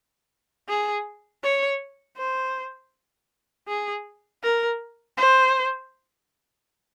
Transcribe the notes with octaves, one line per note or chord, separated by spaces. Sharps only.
G#4
C#5
C5
G#4
A#4
C5